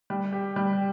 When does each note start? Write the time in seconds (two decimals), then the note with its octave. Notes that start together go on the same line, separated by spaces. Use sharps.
0.10 G3
0.32 G4
0.56 G3